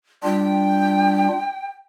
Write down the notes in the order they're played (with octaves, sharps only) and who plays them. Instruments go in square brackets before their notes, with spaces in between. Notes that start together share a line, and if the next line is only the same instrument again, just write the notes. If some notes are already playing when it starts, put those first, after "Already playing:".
[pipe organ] G3 D4 F4 [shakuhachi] G5